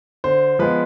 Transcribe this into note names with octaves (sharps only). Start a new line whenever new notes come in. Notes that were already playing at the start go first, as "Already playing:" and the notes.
D3 C5
F3 G#3 B3 B4